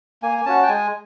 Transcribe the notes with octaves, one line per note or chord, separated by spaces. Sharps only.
A#3 G#5
G#5
C#4 F#4 A5
G5
G#3 G#5